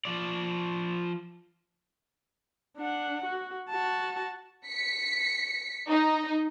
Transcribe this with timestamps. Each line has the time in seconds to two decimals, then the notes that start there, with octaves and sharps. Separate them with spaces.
0.05 F3 D5
2.77 D4 F#5
3.25 F#4
3.70 F#4 A5
4.66 B6 C#7
5.89 D#4